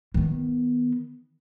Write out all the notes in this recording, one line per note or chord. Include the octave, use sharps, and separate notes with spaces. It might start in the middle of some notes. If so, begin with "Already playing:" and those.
D#3 B3